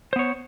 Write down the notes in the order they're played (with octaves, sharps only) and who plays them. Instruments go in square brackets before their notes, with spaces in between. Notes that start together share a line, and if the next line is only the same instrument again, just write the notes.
[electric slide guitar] C5
B3
C#5